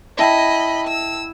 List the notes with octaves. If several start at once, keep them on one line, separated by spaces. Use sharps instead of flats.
E4 D#5 F#5 G5 A5 B5 A#6
E6